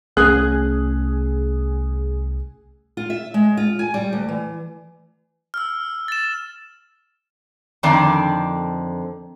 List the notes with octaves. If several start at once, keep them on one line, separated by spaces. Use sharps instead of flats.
C2 A3 C#4 G#4 F#6
F4
E5
G#3
F4
G#5
G3
D2
E3
E6 F6
A6 E7
F2 D3 D#3 C4 D5